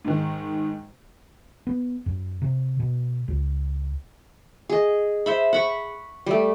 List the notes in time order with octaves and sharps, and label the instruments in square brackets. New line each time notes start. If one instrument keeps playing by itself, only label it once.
[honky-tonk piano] G#2 D#3
[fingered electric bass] B3
F#2
C3
B2
C#2
[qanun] G#4 D#5
C5 E5 B5
F#5 B5 C#6
G3 A3